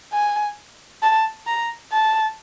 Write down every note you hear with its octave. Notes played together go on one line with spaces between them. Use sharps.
G#5
A5
A#5
A5